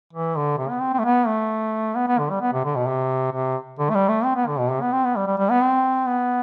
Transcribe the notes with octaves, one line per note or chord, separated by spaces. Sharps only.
E3
D3
C3
B3
C4
C4
A3
B3
A3
B3
B3
D3
G3
B3
C3
D3
B2
C3
C3
D3
A3
G3
A3
C4
B3
D3
B2
C3
B3
C4
B3
G3
G3
G3
B3
C4
B3